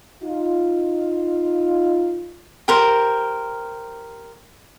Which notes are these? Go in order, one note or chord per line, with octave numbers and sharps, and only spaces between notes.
D#4 F4
G4 A#4 C5